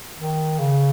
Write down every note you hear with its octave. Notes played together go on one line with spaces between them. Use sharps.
D#3
C#3